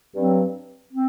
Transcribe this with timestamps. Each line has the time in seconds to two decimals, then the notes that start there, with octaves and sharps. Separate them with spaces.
0.14 G2 F#3 C4
0.93 C4